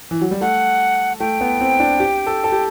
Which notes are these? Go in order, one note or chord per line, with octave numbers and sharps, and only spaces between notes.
E3
F#3
G3
A3 F#5
A3 G5
B3
C4
D4
G4
A4
A4
G4